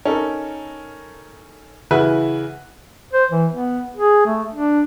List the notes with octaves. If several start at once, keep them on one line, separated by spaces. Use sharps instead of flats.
C#4 D#4 A4 A#4
C#3 E3 E4 F#4 B4
C5
E3
B3
G#4
A3
D4